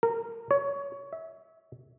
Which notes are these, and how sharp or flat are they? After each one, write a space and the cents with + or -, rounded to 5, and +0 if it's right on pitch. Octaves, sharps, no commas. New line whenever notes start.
A#4 -20
C#5 +20
E5 -25